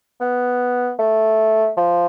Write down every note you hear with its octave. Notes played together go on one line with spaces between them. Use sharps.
B3
A3
F3